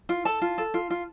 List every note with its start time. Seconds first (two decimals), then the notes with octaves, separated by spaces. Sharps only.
0.09 F4
0.25 A4 A5
0.42 F4
0.58 A4
0.74 F4
0.90 F4